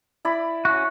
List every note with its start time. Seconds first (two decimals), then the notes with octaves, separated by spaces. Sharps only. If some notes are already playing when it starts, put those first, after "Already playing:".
0.25 E4 D5 B5
0.65 C#4 F#4